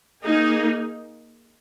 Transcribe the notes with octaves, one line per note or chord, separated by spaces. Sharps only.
A#3 D#4 G#4